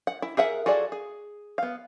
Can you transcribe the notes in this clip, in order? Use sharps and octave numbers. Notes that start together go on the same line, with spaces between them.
F#5
E4
G#4 A#4 E5 F#5
F4 F#4 G#4 A4 D5
G#4
B3 F5